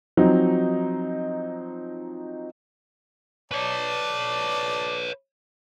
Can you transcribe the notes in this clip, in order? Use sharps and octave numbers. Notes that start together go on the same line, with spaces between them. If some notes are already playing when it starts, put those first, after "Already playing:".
F3 F#3 C4 D#4
B4 C#5 D5 A5